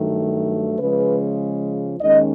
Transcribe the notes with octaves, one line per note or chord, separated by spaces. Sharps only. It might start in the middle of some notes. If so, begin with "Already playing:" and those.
Already playing: G2 D#3 F#3 A3
C#3 F3 G#3 B4
D#2 D#3 G#3 C#4 D#5